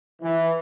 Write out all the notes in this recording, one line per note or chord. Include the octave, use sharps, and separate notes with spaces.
E3